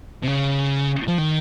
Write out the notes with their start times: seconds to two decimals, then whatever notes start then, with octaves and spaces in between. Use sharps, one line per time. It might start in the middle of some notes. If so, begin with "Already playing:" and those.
0.23 C3
0.28 C#3
1.08 F3
1.18 D#3